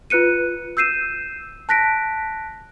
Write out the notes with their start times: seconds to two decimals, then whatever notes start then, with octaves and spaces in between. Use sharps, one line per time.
0.10 F4 B4 F#6 C#7 D#7
0.77 E6 G6 C7 D#7 E7
1.69 A5 F#6 A#6 B6 D7